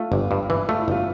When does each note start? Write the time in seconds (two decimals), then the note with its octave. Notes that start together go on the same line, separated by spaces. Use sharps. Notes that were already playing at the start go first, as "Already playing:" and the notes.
Already playing: A3 F4
0.12 G1
0.31 G2
0.50 E3
0.69 A3 F4
0.80 E4
0.88 G1 F4